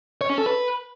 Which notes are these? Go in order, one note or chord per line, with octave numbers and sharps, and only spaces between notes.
C#5
C#4
A4
B4